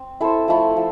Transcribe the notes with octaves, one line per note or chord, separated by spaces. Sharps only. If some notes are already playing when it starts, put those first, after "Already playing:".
Already playing: C4
E4 A4 C5
F3 A3 E4 A4
F3